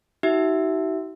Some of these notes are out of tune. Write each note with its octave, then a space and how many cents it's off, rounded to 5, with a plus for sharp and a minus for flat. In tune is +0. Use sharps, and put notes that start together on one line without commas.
D#4 +40 F#4 +35 E5 +0